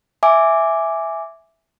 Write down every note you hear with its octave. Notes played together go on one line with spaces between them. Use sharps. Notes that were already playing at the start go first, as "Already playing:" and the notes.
E5 G#5 D6